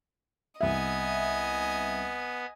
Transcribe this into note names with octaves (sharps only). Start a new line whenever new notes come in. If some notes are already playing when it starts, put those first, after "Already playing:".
C2 B3 D#5 E5 G#5